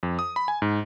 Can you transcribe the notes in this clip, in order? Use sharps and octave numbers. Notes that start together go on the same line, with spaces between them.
F2
D#6
B5
G#5
G#2